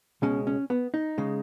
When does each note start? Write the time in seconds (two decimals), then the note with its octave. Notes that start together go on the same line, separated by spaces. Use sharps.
0.22 C#2 B2 G#3 C#4
0.47 C#4
0.70 B3
0.94 D#4
1.18 C#3 G#3